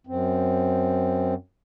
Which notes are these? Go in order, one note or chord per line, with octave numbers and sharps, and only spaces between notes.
F#2 C4